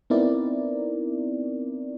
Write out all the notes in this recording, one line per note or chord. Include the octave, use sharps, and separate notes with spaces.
B3 C4 D#4 E4 A#4 D5